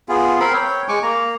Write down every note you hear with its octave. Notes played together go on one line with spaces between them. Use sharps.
B3 F4 G#4
C4 A#4 B5 C6
C#5 G5
G#3 G#5 C#6 D6
A#3 A#5